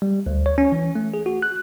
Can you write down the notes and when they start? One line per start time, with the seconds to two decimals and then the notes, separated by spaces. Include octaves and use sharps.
0.02 G3
0.26 D2
0.46 C#5
0.58 C#4
0.72 E3
0.96 A3
1.14 G#4
1.26 F#4
1.42 F#6